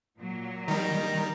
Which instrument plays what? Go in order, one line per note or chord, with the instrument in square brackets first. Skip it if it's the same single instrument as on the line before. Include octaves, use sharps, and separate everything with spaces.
[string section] A#2 F#3
[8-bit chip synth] D#3 G3 [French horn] D#4 [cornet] A#5